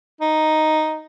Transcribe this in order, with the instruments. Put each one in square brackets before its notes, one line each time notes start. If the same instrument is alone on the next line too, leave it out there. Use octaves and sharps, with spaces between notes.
[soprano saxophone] D#4